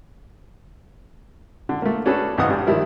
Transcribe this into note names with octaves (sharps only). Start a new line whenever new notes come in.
D3
A3 A#3
C#4 D4 F#4 G#4 A4 B4
B1 G#2 E3 F5 F#5 D#6
G2 G3
D#3 F3 G3 E4 A#4